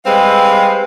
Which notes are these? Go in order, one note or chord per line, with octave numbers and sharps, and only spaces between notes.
G3 G#3 C4 B4 F5